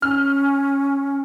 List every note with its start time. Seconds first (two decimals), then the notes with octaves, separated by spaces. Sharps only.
0.02 C#4 F6